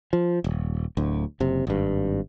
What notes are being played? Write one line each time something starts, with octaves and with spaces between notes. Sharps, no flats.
F3
D#1
D1 D2
F#1 C3
G#1 G2